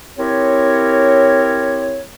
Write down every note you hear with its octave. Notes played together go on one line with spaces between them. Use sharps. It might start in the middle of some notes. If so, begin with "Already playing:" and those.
C4 E4 G4 A#4 C#5